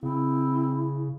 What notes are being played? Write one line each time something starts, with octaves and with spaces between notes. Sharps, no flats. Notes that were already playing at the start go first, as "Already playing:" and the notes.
C#3 C4 E4